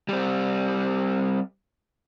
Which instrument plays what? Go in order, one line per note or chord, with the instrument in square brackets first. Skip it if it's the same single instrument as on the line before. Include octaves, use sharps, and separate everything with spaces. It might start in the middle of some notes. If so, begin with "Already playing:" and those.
[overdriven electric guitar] G3 C4